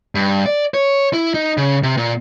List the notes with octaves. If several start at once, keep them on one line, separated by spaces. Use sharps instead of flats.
G2
D5
C#5
E4
D#4
C#3
C3
A#2